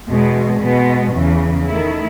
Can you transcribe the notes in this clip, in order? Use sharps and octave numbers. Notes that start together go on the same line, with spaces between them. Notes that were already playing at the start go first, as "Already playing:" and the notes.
E2 B2 G#3
B2 G#3 B3
E2 C#3 E3
D#3 A3 E4